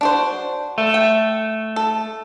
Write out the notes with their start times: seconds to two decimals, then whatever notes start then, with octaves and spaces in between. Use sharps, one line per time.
0.01 D4 F#4 C5
0.78 A3
0.94 G5
1.76 A4